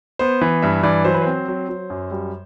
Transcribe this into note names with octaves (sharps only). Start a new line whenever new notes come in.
B3 C5
E3
G2 E5
E3 D5
F#3 C5
B4
C4 C5
F#3
F#3
F#2
G3